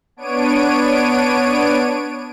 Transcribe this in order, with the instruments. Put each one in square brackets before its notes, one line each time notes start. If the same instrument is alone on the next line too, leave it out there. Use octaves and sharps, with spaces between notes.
[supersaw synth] B3 D4 C#5 D7 D#7